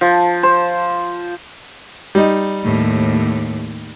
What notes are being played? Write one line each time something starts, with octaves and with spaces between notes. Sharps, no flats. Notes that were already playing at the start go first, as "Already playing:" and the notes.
F3
C5
G3 D#4
D#2 A2